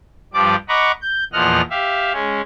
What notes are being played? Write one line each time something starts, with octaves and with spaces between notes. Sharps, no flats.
G2 F3 G3 D5 D6
D#5 F#5 A#5 B5 C#6 D6
G6
E2 A#2 F3 D#5 F#5 F6
G4 E5 F5
G#3 C#4